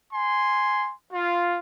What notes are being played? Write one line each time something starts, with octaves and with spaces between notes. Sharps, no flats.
G#5 C6
F4